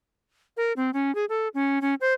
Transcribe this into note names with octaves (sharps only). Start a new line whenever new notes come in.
A#4
C4
C#4
G#4
A4
C#4
C#4
C5